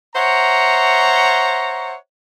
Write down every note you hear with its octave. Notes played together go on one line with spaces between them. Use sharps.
C5 C#5 E5 F#5 A#5